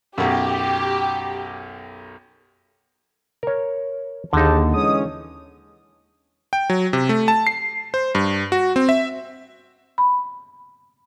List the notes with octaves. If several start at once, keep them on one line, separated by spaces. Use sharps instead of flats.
B1 F#2 G4
A#4 C#5
D#2 D3 D#4 G#4 A5
E3 G#3 C#4 D#6
G5
F#3
C3
A3
A5
C7
C5
G2
F#4
C4
E5
B5